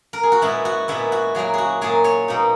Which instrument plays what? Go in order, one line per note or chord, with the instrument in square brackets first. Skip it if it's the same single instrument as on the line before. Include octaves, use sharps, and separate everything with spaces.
[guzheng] A#4
G#4
F#4
A#2 G#3 B3 E4
F#4
A#2 G#3 B3 E4
F#4
A#2 F#3 A#3 G#4
F#4 G#4
A#2 F#3 A#3 G#4
C#5
B2 A#3 D#4